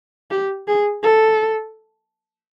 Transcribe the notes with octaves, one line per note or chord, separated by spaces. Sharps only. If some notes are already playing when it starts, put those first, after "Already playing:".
G4
G#4
A4